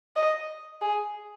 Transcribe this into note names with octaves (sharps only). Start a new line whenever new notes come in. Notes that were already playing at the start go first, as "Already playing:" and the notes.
D#5
G#4